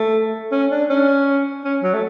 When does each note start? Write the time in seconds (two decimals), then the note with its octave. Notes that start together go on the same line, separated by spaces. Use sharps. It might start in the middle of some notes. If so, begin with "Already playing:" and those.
Already playing: A3
0.52 C#4
0.71 D4
0.90 C#4
1.65 C#4
1.83 F#3
1.94 A3